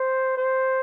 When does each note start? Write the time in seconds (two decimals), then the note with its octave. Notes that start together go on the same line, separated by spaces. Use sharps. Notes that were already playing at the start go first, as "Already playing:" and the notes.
Already playing: C5
0.37 C5